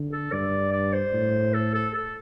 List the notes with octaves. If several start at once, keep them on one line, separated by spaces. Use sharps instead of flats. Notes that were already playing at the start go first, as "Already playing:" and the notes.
Already playing: D3
A4
G2 D5
D5
C5
A2
A4
A4
A4